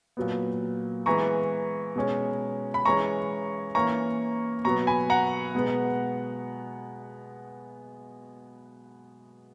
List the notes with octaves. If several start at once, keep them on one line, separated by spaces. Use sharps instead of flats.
A#2 F#3 B3
E3 G#3 B3 A#5 C#6
B2 G#3 C#4
B5
E3 G#3 C#4 A#5 C#6
E3 A#3 C#4 A#5 C#6
B2 F#3 B3 A#5 C#6
G#5 B5
F#5 A#5
B2 G#3 B3